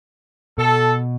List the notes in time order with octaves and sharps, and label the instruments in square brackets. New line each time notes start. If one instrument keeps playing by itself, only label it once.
[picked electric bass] B2 [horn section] A4